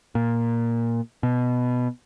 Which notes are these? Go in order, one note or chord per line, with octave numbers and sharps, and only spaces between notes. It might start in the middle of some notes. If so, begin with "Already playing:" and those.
A#2
B2